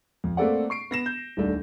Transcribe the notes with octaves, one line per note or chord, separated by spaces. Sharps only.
F2
A3 A#3 C4 A4 D5 F#5
C#6 C7 D7
B3 A#6 E7
G6
D#1 C2 A3 D4